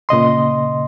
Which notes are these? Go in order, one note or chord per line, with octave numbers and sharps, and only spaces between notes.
A#2 C#3 D#5 C6